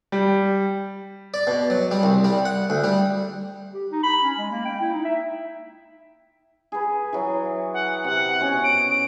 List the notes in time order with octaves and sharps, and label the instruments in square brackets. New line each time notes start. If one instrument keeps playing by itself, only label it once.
[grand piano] G3
[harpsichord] D5
B2
F#3
G3
C2
G3
F#5
D2
G3
[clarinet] G4
D#4
B5
C#4
G#3
A#3
G5
E4
D#4
E5
[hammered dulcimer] G#4 B4
E3 F#3
[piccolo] F#5
[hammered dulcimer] C3 [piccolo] F#5
[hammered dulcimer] B2 C#4 F#4
[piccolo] D7